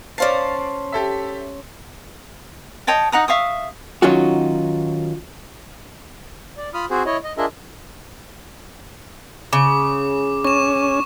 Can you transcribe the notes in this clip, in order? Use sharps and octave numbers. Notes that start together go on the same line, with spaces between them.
C#4 C5 D5 F5 A5 C7
G4 A4 E5
C#5 D#5 G5 A5
D#4 F#5 A#5 D#6
E5 F5 C#6 D#6
D#3 F#3 C#4 D#4 F4 F#4
D5
F4 B5 D#6 F6
C4 F#4 G#4 C5
E4 C#5 D#5
D#5
D4 F4 G#4 A#4 D#5 E5
C#3 D6
C#4 C#6 E7